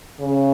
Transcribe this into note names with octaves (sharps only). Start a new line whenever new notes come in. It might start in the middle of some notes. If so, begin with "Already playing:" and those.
C#3